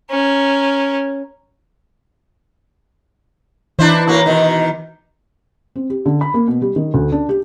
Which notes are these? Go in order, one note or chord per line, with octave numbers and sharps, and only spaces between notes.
C#4 A#4
E3 D4 E4 C5
A2 A#3 F#4
B2 D#3
C4
G4
D3
B5
A#3
B2
G3
D#3
D2
D4
G4